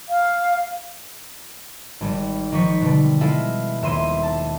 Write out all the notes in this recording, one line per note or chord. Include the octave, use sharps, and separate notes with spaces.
F5
G#1 G3
D#3 F3 C#6 B6 C#7
B2 D3 G3
G#3 E4 F4 A4 F5
D#1 E5 C6 D#7
A5